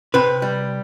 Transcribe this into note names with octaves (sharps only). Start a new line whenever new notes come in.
C3 B4
G3